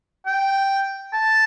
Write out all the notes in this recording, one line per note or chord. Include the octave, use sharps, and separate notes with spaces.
G5
A5